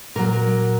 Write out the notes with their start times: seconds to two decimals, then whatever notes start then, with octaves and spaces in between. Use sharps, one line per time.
0.15 A#2 F#3 A#4